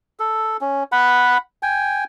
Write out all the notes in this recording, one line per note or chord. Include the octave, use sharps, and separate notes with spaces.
A4
C#4
F#5 B5
G5 G#5